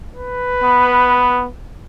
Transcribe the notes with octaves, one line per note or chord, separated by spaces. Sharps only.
B4
B3